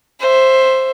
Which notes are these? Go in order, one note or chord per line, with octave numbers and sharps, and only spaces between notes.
C5 E5